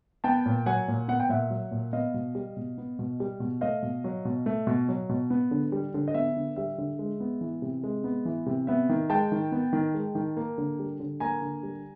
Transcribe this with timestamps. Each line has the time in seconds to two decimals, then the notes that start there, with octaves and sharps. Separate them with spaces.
0.24 B3 G5 A5
0.46 A#2
0.66 F#3 F#5 G#5
0.88 A#2
1.08 B3 F#5
1.20 G5
1.29 A#2 E5 F#5
1.50 F#3
1.71 A#2
1.93 B3 D#5 F5
2.14 B2
2.35 G3
2.57 B2
2.78 B3
2.99 B2
3.20 G3
3.40 B2
3.61 A3 D#5 F5
3.83 B2
4.04 F#3
4.25 B2
4.46 A3
4.67 B2
4.89 F#3
5.09 B2
5.30 B3
5.51 D3
5.72 G3
5.94 D3
6.08 D#5
6.14 B3 E5
6.36 D3
6.56 G3 E5
6.78 D3
6.99 G#3
7.20 B3
7.41 E3
7.62 C3
7.83 G#3
8.04 B3
8.25 E3
8.46 C3
8.67 B3 E5
8.89 D#3
9.10 G#3 G5 A5
9.32 D#3
9.52 B3
9.73 D#3
9.94 G#3
10.15 D#3
10.37 A#3
10.58 D3
10.79 G3
11.00 D3
11.20 A#3 G#5 A#5
11.42 D3
11.63 G3